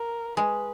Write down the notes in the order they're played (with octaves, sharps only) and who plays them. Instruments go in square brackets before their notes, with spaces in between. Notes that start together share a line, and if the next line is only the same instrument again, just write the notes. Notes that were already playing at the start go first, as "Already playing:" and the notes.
Already playing: [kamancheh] A#4
[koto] G#3 [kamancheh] B4